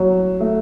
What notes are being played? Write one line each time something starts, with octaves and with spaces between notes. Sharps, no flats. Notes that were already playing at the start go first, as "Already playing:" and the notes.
Already playing: F#3
A3